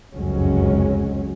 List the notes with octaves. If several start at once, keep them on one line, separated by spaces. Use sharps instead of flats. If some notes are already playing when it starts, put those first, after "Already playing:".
F1 C#2 F#2 F#3 G#3 C#4